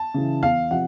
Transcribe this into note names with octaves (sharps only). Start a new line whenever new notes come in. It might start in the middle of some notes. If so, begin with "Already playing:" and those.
Already playing: A5
C#3 E3
E2 F5
C3 F3 F#5